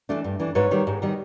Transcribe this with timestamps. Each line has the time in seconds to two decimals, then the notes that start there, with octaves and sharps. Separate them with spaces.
0.09 E3 A3 D4
0.24 G2
0.39 E3 A3 D4
0.55 G#2 B4 C#5
0.71 D#3 G3
0.87 G#2
1.02 D#3 G3